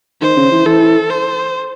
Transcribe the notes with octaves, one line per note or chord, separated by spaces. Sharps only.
D#3 C5
C#3
E3
E3 A4
C5